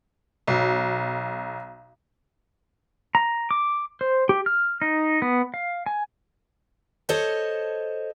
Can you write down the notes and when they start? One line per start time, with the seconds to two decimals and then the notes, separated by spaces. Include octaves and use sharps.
0.47 B1
3.15 A#5
3.51 D6
4.01 C5
4.29 G4
4.46 F6
4.82 D#4
5.22 B3
5.54 F5
5.86 G#5
7.09 A4 C5 C#5 D#5 A5